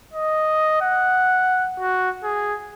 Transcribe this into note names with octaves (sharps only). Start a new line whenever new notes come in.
D#5
F#5
F#4
G#4